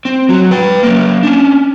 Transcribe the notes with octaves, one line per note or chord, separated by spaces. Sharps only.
C4
F#3 F#4
B4 G5
F#3 A#3
C#4 D4